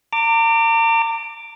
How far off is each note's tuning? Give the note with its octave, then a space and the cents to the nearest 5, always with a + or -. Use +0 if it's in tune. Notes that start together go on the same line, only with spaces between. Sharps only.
A#5 -40 D6 +5